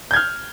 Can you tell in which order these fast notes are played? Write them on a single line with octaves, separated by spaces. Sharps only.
G6 G#6 F6